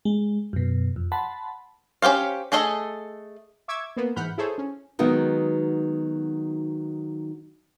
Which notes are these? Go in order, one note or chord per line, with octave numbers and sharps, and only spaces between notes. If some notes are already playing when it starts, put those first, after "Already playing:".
G#3
F#2 B2
F2
F#5 A5 B5 C6
C#4 G4 C5 F5
A3 G#4 A4 D#5 G#5
E5 C#6 D6 E6 G#6
A#3 B3
G#2 E3 F#5 B5 F6 G6
E4 G#4 A4 C5 C#5
C#4
D#3 F#3 G#3 B3 D#4 F#4